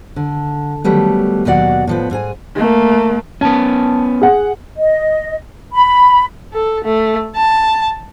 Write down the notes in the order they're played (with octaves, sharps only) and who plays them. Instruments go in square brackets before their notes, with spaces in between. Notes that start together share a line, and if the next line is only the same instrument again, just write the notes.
[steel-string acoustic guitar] D3
D#3 F#3 G3 A3 B3
D#2 B2 F#3 D5 F#5
A2 F3 B3
G#2 G#4 G#5
[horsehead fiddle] A3 A#3
[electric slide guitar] B3 C#4 [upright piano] A5
[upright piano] G#4 F#5
[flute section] D#5
B5
[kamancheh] A4
A3
A5